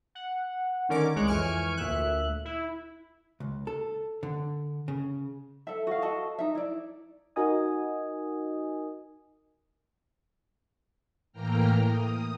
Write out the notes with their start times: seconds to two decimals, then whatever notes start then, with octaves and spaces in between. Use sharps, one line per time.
0.15 F#5
0.89 D3 D#3 C#4 A#4 D5 D6
1.15 C2 G#3 C#5 D6 F#6
1.27 F2 E3 G#5 C#6 F6 D7
1.77 D2 A#2 E5 F#6
2.45 E4
3.40 C#2
3.67 A4
4.23 D3
4.88 C#3
5.67 A4 E5
5.87 F#4 F5
6.02 F#4 A4 D#5 A5
6.39 D#4 E5
6.55 E4 D5
7.36 D#4 F#4 A#4 D#5 G#5 D#6
11.32 A2 E3 A#3 G5 A#5 F6
11.85 D#6